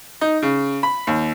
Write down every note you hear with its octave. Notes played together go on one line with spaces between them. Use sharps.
D#4
C#3
B5
D#2